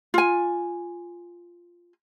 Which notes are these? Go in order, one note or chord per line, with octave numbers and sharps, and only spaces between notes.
F4 G#5